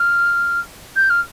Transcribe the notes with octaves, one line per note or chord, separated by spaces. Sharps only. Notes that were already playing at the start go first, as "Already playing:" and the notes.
Already playing: F6
G6
F6